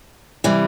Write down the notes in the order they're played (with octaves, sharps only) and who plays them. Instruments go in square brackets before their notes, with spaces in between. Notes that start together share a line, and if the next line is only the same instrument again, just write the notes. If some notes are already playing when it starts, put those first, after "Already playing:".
[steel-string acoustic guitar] C3 E3 G3